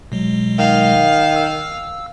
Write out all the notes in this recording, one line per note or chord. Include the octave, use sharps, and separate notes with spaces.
B2 F#3 G#3
D#3 F5
E6